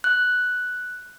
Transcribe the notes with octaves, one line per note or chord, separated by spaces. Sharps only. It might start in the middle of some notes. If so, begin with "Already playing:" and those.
F#6